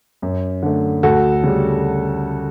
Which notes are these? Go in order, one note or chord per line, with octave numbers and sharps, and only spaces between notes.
F#2
D3 A3
D2 F#4 A4
C#3 G3